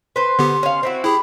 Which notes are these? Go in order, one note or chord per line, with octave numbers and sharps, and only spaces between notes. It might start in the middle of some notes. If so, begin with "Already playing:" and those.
B4 C5 C6
D3 B3 G4
C#4 F5
C4 E4 F#4
E4 G4 G#4 B5